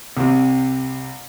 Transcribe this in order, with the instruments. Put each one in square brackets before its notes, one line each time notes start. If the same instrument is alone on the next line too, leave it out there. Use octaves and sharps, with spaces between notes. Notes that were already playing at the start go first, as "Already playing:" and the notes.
[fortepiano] C2 C3